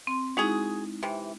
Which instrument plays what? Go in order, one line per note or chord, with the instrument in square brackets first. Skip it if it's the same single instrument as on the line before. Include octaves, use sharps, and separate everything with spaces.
[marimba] C4 C6
[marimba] G#3 D#4 E4 [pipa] F#4 G#4
[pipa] C3 E3